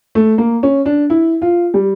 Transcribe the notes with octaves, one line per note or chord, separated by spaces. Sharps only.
A3
A#3
C#4
D4
E4
F4
G3